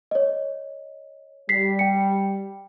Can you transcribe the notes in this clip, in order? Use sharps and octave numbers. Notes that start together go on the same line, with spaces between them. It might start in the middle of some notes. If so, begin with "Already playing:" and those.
C#5 D#5
G3 B6 C7
G5 C#7